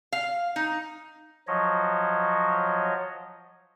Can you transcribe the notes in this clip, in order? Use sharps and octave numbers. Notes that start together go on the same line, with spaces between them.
F5
D#4
F3 F#3 C#5 D#5